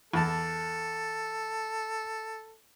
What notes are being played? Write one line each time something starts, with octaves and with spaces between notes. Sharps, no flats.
E2 A4 A5